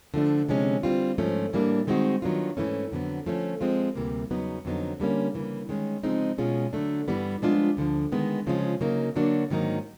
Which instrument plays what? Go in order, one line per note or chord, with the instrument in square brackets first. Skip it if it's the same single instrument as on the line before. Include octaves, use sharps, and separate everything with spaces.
[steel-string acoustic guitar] D3 F3 A3 D4
C3 F3 G#3 C#4
E3 G3 C4 F4
G#2 F3 A3 C#4
A2 E3 G3 A#3 D4
D#3 G#3 C4 D#4 F#4
D#3 F#3 B3 D4 F4
G#2 E3 A3 C#4
F2 D3 F#3 B3
F3 A3 C#4
F3 G#3 C4 F4
D2 C3 E3 G3 A#3
E2 C#3 F#3 B3 D#4
F2 D3 F#3 B3 D#4
D3 G3 A#3 C#4
C#3 E3 G3 A#3
D#3 G#3 C#4
C#3 F3 G#3 C4 D#4
B2 G#3 C#4 F4 G#4
D3 F#3 A3 D4
G2 E3 G3 B3
F3 G#3 B3 D4 F4
D2 D3 F3
D#3 G#3 B3
C#3 F3 G#3 C#4 F4
C#3 F#3 A#3 D#4
D3 F#3 A#3 D4 F#4
G#2 D#3 F#3 A#3 D#4